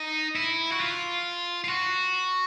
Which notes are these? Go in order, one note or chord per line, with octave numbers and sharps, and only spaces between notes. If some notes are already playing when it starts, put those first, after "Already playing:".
Already playing: D#4
E4
F#4
F4
F4
F#4